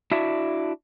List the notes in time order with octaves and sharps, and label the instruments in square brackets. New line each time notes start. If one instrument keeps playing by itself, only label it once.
[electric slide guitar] D4 E4 F#4 E5